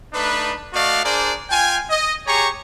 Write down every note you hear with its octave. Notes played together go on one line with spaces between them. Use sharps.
A3 D4 D#4 B4
A3 F#4 D5 D#5 F5
D4 G#4 A#4 C5 D5
F4 G5 G#5
D#5
G4 G#4 C#5 A#5 C#6